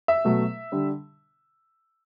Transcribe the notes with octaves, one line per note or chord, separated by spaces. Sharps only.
E5
B2 F#3 A3
D3 G3